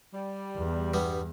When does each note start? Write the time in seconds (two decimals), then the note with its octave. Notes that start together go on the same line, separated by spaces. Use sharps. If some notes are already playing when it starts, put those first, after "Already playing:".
0.13 G3
0.57 E2
0.94 G2 G3 B3